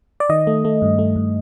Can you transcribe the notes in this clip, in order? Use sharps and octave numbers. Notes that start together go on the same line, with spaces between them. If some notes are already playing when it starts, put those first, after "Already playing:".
D5
D#3 D#5
A3
A3
G2
A3
G2